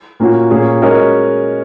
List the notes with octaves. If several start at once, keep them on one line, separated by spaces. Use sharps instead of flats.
A#2 A#3 C#4 F#4
A#2 A#3 C#4 G#4 C#5
G#3 C#4 F#4 A#4 D#5